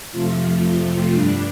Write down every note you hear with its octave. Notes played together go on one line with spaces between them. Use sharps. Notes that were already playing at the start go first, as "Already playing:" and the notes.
F2 C3 F3 A3 F4
F4
G2 G3 D4